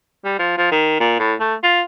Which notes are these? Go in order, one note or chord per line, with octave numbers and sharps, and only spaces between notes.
G3
F3
F3
D#3
A#2
A2
A3
F4